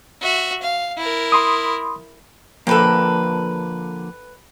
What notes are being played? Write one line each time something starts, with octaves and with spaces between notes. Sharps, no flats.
F#4 E5
F5
E4 A#4
B5 C6 D#6
D3 F3 A#3 A4 B4 G5